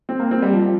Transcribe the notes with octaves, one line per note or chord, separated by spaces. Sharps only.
C4
A#3
C4
G3
F3
F3